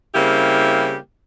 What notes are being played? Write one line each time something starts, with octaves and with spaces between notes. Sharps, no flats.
C#3 G3 A#3 C4 E4 G4